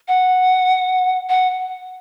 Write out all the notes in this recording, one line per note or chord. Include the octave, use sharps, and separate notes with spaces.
F#5
F#5